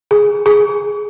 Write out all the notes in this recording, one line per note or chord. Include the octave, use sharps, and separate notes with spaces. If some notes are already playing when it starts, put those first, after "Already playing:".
G#4
G#4